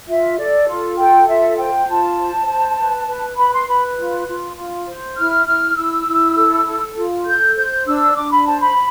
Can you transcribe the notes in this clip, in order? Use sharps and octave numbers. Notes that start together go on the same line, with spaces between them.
F4 E5
A4 D5
F4
A4 G5
F4 E5
C5 G5
F4 A5
C5
C5
B4
B4
B4 B5
C6
B4 B5
F4
F4
F4
C5
E4 F6
E4 F6
E4 E6
E4
A4
A4
F4
A4 G6
C5 G6
D4 E6
D4 D6
B5
C5 A5
B5